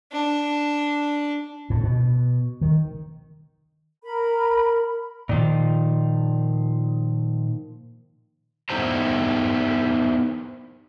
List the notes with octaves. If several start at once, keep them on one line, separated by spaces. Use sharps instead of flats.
D4
A2
B2
D#3
A#4 B5
A#2 D#3 F3
B3 D#4 E4 G4 C5 A#5